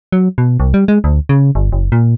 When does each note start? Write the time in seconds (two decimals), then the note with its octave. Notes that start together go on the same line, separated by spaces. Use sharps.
0.12 F#3
0.38 B2
0.60 C2
0.74 G3
0.88 G#3
1.04 D2
1.29 C#3
1.55 G1
1.72 F#1
1.92 A#2